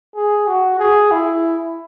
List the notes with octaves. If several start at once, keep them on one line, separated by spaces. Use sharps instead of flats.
G#4
F#4
G#4
E4